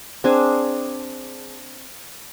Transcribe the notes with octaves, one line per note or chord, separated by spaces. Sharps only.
C4 D4 G#4 G#5